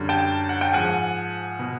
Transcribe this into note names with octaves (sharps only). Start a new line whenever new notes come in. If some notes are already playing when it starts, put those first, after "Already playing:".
Already playing: F#2 D3 G3
G5 A5
F#5
G5
G#2 F3 F#5 G#5
B2